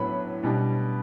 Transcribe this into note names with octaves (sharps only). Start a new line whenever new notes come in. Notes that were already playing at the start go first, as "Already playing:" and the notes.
Already playing: A2 F#3 B3 D4 B5
B2 G3 B3 D4